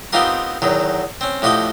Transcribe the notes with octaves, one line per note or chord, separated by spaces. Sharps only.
B3 C4 D#4 F4 G4 A#4
E2 D#3 F#3
C4 C#4
A2 F3 F#4 G4 D#5 D#6